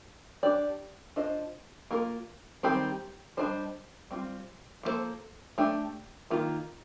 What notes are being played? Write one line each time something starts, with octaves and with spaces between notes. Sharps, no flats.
D4 G4 D5
D4 F4 C5 D#5
A#3 F4 A#4
D#3 G3 C4 G4
G3 D4 F4 C5 D#5
G3 C4 F4
F3 A#3 F4 A4 C5
A3 D4 G4
D#3 A#3 F4